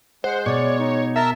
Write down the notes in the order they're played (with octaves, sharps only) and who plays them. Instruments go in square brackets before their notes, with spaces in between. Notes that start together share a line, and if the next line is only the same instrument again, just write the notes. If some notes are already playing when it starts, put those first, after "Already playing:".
[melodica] G#3 [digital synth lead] C5 [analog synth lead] F#5
[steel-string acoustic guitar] B2 [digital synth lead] C#5 [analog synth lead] D5
[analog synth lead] D#4
[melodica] A#4 A5 A#5 [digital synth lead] E5